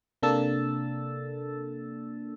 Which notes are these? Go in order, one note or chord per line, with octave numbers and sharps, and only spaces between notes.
C3 A#3 D4 A4 E6 A6